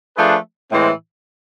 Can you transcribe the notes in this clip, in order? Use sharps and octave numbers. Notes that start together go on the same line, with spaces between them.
F3 A3 D4 G#4 B4
A2 E3 G#3 C4